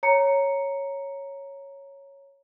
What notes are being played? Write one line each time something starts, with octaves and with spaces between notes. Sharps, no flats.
C#5 A#5 C#7